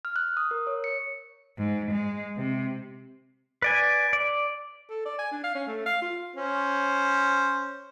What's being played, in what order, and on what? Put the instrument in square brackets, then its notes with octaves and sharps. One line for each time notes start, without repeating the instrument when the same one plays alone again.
[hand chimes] F6
F#6
D#6
A#4
C#5
C#7
[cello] G#2
G#3
C3
[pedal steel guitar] B4 D5 G#5
D5
[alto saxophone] A4
D5
G#5
D4
F5
C#4
A3
F5
F4
[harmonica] C#4 C5